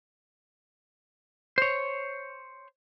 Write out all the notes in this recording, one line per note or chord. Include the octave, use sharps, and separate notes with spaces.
C5 C#5